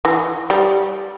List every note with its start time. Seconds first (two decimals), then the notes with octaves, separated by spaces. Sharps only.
0.05 E3
0.50 G3